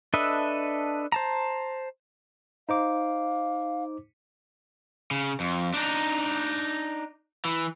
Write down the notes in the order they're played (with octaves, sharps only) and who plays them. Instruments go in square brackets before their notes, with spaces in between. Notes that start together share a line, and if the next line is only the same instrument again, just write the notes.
[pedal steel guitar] D4 A4 B4 D#5 E5
C5 A5 A#5
[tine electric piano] D#4 C5 D6 [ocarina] F5
[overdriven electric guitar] C#3
F2
D4 D#4
E3